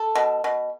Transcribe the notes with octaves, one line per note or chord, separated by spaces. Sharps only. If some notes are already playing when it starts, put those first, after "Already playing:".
Already playing: A4
B2
B2